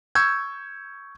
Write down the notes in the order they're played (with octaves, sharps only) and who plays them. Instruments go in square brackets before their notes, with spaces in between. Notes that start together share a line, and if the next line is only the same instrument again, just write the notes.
[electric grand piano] C#6 E6 G6 G#6